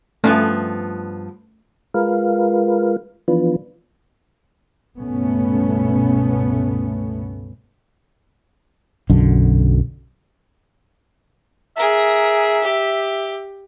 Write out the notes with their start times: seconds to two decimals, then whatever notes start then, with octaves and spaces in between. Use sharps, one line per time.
0.24 G2 F3 A3 B3 C#4
1.94 G#3 F4 A#4 B4 F5
3.28 E3 F3 B3 D4 F4 B4
4.98 C#2 G2 B2 A3 B3 C#4
9.10 B1 F#2 D3
11.77 G#4 A#4 E5
12.64 G4